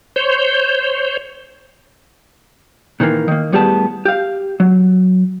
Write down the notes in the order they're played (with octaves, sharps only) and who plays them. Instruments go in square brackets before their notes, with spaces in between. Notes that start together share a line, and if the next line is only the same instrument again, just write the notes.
[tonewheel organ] C5 C#5 G6
[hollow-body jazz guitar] A#2 D#3 E3 A#3
D#3 A#3
A2 G3 B3 G4 G#4 A5
G4 F5
F#3